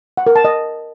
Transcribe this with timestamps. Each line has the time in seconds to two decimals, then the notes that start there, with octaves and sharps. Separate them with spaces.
0.17 F#5
0.27 A#4
0.36 A5
0.45 D#5